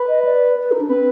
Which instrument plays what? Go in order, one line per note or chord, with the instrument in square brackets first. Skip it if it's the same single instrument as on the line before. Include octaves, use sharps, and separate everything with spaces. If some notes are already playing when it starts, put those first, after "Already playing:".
Already playing: [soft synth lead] B4
[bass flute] D#5
D5
B4
D#4
D4
[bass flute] C4 [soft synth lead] B4